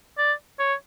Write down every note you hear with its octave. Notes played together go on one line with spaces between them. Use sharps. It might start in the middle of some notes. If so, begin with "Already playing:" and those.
D5
C#5